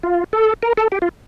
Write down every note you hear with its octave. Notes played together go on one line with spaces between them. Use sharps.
F4
A4
A#4
A4
G4
F4